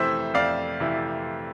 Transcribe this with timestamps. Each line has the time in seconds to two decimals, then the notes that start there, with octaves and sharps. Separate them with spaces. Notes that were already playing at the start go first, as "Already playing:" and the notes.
Already playing: F2 C3 E3 A3 E4 C5 E5
0.34 F2 D5 F5
0.80 C3 E3 A3 E4